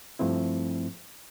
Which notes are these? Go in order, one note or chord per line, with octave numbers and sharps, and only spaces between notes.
G2 F3 A3 C4 E4